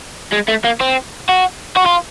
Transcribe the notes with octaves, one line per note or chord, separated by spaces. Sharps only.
G#3
A3
A#3
C4
F#4
F#4
F4